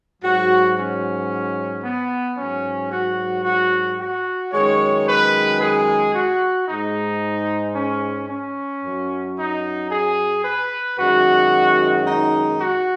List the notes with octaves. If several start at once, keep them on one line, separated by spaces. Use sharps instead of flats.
G#2 F#3 F#4
C#4
B3
G#2 F#3 C#4
F#4
F#4
F#4
F#2 D#3 G#3 C#5
B4
G#4
F#4
G#2 G#3 D#4
C#4
C#4
F#2 F#3
D#4
G#4
B4
F#2 D#3 G#3 F#4
D#4
F#4